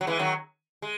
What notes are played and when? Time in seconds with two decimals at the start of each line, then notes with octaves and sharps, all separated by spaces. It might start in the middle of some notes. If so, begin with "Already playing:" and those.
0.01 F#3
0.07 E3 G#3
0.19 D#3 F#3
0.82 G#3